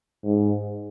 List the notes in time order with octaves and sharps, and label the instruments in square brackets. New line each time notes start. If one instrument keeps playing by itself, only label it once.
[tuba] G#2